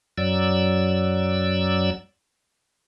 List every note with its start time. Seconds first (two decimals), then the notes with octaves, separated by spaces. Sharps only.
0.18 F#2 F#3 D5 E6